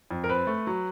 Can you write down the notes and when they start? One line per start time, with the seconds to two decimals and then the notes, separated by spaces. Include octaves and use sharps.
0.11 F2
0.24 A#4
0.29 C4 B4
0.47 A3
0.67 F#3